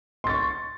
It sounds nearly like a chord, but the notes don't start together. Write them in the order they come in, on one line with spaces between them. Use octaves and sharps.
C6 A6 C#6